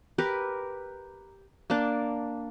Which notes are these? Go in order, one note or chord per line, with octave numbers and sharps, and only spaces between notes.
G4 A#4 B4
A#3 D4